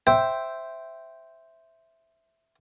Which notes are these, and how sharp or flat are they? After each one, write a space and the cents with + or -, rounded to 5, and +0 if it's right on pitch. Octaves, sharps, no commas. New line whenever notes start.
C5 +0 E5 +0 G5 -5